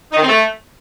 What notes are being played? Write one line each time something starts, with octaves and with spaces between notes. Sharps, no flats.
D#4
D#3
C4
A3